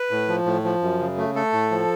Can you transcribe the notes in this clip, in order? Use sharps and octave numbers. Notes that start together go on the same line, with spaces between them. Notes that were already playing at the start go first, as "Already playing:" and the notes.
Already playing: B4
A2
F3
A2
F3
F#2
C#3
A3
A3 A4
A2
F3